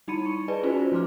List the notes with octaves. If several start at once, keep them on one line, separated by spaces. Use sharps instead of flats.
G3 D#4 E4 B5 C#7 D#7
C#6
G#4 B4 D5 D#5 G#5 A5
C#4 D#4 F4 F#4 B4 C5
F3 A3 C6 D6 F6